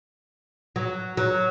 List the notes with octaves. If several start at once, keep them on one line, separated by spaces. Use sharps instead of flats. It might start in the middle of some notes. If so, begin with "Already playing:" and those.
F#3
F#3